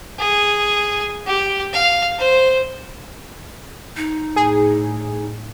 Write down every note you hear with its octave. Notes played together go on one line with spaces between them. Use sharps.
G#4
G4
F5
C5
D#4
A2 G#4